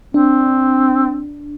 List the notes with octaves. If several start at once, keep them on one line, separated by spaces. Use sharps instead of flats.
C4 D4